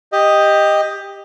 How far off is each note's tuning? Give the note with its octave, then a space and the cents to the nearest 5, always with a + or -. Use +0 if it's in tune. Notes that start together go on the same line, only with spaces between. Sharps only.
G4 +15 D#5 +0